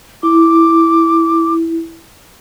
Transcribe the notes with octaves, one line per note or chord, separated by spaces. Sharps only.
E4 D6